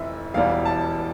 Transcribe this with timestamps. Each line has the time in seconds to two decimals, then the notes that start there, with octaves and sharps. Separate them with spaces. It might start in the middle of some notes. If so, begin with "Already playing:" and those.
Already playing: F1 F2 E3 E5
0.34 E1 E2 E3 G3 F5
0.66 A5